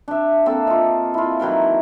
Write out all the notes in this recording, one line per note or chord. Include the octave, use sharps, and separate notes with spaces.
D4 E5
A#3 C4 A4 E5
F4 D#5
E4 F4
D#3 E3 F#3 A#4